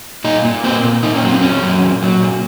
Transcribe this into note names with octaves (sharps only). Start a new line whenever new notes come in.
A#2 D#4
A#2
A#3 C4
A#2
A#3 D#4
C#4
F#3
C4
A#2 C#4
F#3
A#2
F#3
A#2